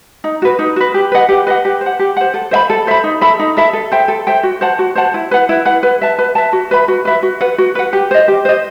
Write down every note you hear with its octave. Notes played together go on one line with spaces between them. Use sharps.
D#4
F#4 B4
D#4
F#4 B4
G4
B4 D#5 F#5
G4
B4 D#5 F#5
G4
C5
F#5
G4
C5 F#5
A4
C5 E5 B5
A4
C5 E5 B5
D#4
A4 E5 B5
D#4
A4 E5 B5
A4
C5 E5 G5
A4
C5 E5 G5
F#4
C5 F#5 A5
F#4
C5 F#5 A5
E4
B4 F#5
E4
B4 F#5
B4
E5 A5
B4
E5 A5
F#4
B4 E5 B5
F#4
B4 E5 B5
F#4
B4 F#5
F#4
B4 F#5
G4
C5 D#5
G4
C5 D#5